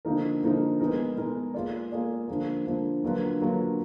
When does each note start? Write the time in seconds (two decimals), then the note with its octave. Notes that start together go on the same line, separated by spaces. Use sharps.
0.05 D3 F3 A#3 D#4 A#4
0.43 D3 F3 A#3 D#4 A#4
0.80 G#3 B3 D#4 A#4
1.17 G#3 B3 D#4 A#4
1.54 A#3 F4 G#4 D5
1.92 A#3 F4 G#4 D5
2.28 D3 F3 A#3
2.65 D3 F3 A#3
3.03 D3 F#3 A#3 F4 B4
3.40 D3 F#3 A#3 F4 B4